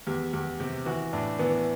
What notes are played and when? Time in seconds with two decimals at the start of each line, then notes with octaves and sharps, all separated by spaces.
0.07 E2 G4
0.33 E2 G4
0.60 C3 G4
0.85 E3 F#4
1.13 A2 D4
1.39 E3 B3